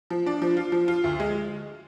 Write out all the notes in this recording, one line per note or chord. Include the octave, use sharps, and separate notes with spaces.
F3
D4
F3
F4
F3
F4
D2
G#3